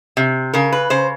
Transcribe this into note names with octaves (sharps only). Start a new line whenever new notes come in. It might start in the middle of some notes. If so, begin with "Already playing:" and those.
C3
C#3 A#4
B4
C#3 C5